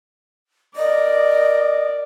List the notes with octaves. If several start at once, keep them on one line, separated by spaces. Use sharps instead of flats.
A#4 D5 D#5